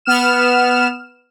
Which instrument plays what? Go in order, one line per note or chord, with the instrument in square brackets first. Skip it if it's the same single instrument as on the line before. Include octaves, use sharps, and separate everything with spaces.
[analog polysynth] B3 F6 E7